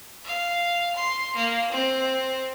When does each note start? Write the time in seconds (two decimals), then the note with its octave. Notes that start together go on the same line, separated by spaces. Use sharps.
0.25 F5
0.96 C6
1.35 A#3
1.72 C4